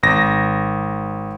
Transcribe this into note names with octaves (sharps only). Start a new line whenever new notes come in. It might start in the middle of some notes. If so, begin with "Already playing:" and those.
G#1 A#6